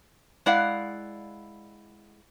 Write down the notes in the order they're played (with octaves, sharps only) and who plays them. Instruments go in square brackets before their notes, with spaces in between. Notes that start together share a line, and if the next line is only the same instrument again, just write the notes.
[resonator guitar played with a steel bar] G#3 E4 D5 F5 F#5